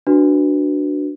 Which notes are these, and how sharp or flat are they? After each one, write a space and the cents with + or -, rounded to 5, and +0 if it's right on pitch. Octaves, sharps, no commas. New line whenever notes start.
D4 +0 F#4 +0 B4 +0